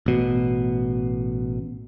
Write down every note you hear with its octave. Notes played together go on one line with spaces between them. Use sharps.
A1 B2